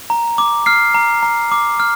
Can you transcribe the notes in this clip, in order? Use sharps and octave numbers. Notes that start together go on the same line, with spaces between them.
A#5
D6
F6 C7
A#5
A#5
D6
F6